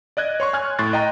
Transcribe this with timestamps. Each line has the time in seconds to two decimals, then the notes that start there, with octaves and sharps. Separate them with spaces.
0.17 D5 D#5 F#6 G#6
0.40 C#5 C6 C#6
0.53 G#5 F6 F#6 G#6
0.79 A2 C6 C#6 F#6 A6
0.93 D#5 G5 A#5